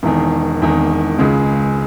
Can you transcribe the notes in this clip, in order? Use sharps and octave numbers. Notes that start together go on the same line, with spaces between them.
E1 E2 D#3
E1 E2 D#3
C#2 C#3 G#3